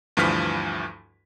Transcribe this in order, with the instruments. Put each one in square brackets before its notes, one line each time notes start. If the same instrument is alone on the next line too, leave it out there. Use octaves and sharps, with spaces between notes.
[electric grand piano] D2 G2 E3 F3 F6 B6